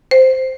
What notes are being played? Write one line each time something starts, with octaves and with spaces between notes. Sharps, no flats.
C5